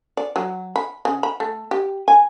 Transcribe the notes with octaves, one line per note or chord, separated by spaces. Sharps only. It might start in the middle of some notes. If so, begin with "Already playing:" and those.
D5
F#3
B5
C#3
B5
A3
G4
G#5